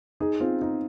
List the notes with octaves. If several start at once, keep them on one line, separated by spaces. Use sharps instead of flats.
D#4 G#4
C4 F4
D#4